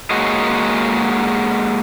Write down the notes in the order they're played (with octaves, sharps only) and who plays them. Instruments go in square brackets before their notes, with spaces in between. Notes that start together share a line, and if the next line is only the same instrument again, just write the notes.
[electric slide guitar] G#3 A#3 F#4 G#4 C#5 D#5